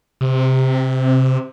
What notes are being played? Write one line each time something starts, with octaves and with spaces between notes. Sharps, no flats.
C3